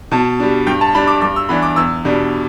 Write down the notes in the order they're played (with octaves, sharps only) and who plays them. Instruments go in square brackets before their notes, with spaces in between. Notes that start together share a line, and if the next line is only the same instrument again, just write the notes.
[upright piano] B2 A5
G3 D4
G2 G5
A5
G3 D4 B5
D6
G2 D6
E6
E3 B3 D4 B5
D6
E2 E6
B2 G3 D4